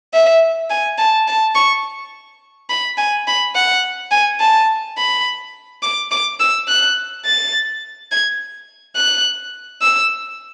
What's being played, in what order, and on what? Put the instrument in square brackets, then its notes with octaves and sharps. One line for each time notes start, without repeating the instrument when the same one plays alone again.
[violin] E5
G#5
A5
A5
C#6
B5
G#5
B5
F#5
G#5
A5
B5
D6
D6
E6
F#6
A6
G#6
F#6
E6